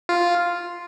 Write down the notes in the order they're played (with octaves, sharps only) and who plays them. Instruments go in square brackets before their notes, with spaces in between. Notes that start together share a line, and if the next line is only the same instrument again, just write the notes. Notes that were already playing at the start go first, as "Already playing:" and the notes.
[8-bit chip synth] F4